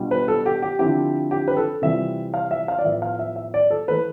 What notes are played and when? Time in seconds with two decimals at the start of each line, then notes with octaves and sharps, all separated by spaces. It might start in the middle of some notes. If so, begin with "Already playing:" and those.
Already playing: B2 G3 D4 F4
0.11 B4
0.28 A4
0.46 G4
0.62 G4
0.79 D3 F3 C4 E4 G4
1.31 G4
1.48 B4
1.57 A4
1.82 C3 E3 G3 C4 F4 E5
2.34 F5
2.51 E5
2.68 F5
2.79 D5
2.84 A2 F3 B3 E4 E5
3.02 F5
3.19 E5
3.36 E5
3.54 D5
3.70 A4
3.88 E3 A3 B4